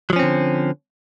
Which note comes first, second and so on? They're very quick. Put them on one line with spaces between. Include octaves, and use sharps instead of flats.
F#3 F3 C#4 C4 D3